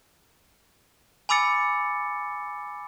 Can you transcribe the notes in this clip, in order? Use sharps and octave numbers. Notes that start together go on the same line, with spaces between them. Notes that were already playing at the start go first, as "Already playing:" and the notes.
G#5 B5 D6 E6 A6 C#7